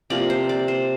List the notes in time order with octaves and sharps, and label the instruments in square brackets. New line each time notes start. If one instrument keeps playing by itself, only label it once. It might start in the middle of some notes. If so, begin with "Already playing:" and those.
[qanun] C3 F3 A#3 D5
C5
D5
C5